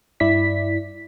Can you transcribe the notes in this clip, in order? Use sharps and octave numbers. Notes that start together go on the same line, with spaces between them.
G2 E4 D5 B6